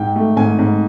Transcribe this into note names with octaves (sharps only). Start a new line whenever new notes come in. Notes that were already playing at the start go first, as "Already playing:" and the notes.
Already playing: G#2 G5
A3
G#2 G#5
G#2